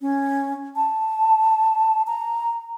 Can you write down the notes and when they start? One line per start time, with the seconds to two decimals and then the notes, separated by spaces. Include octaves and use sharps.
0.01 C#4
0.76 A5
2.07 A#5